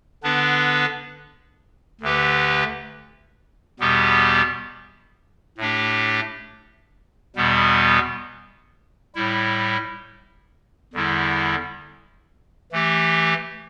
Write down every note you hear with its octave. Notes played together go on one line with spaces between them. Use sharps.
D3 B3 D4 B4
D2 D3 A3 G4 B4
E2 B2 G3 B3 G4
A2 A3 D4 G4
E2 B2 G3 B3
A2 G3 E4
E2 D3 G3 E4
E3 A3 G4